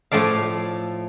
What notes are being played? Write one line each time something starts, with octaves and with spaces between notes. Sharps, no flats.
A2 F3 A3 D5 F5